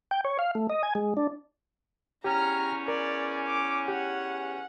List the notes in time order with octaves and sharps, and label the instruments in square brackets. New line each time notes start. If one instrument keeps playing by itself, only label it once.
[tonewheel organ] G5
C#5
F5
A3
D#5
G#5
G#3
D4
[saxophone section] E2 C#4 [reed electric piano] G4 G5 [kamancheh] A#5 F6
[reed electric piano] A#4 [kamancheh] D5
[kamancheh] D6
[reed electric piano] G4 [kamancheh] F#5